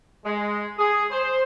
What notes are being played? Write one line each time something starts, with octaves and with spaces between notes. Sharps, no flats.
G#3
G#4
C5